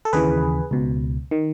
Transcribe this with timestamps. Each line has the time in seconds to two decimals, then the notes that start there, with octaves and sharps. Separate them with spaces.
0.05 A4
0.13 D#2 C#3 E3 G#4 B4
0.71 C#2 B2
1.31 D#3